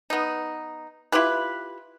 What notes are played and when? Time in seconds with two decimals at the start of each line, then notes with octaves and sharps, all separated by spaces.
0.10 B3 D#4
1.12 E4 F4 G4 B4